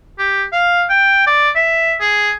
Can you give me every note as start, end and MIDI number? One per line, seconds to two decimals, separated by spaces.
0.19 0.45 67
0.53 0.84 77
0.89 1.26 79
1.27 1.50 74
1.56 1.95 76
2.01 2.32 68